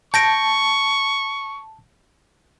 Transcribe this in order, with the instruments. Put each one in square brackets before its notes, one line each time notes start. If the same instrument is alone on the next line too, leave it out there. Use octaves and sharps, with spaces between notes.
[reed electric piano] A5 [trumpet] C#6 [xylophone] G6 A#6 D7